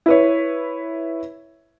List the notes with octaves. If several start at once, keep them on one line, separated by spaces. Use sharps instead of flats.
E4 B4 C#5